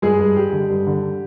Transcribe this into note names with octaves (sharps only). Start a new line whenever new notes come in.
G2 G#3 G#4
G2
G3 G4
D3
G2
D3